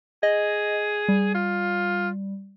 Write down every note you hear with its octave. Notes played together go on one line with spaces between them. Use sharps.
G#4 D#5
G3
F4